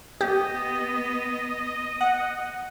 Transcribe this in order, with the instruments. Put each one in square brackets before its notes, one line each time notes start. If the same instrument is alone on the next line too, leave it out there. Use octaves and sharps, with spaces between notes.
[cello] B3 [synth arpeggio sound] G4 [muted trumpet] D#5
[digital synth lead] F#5